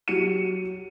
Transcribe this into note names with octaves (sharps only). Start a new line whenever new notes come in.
F#3 G4 C#7 D#7